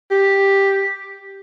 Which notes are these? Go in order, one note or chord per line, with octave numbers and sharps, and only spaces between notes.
G4